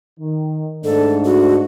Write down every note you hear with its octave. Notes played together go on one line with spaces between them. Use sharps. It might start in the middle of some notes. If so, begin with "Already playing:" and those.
D#3
G#2 A3 D4 A4
F#4